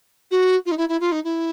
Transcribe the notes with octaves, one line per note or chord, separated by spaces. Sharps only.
F#4
F4
D#4
E4
E4
F4
D#4
E4